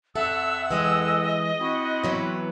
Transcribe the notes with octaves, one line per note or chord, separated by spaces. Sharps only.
F2 A4 E5 F#5 E6
E3 G#3 D#5
C4 E4 F#4
E3 F#3 B3